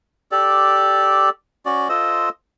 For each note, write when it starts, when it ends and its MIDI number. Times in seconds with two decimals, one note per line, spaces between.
0.32 1.29 67
0.32 1.29 69
0.32 1.29 74
1.66 1.88 61
1.66 1.88 66
1.66 1.88 74
1.89 2.29 65
1.89 2.29 69
1.89 2.29 72
1.89 2.29 75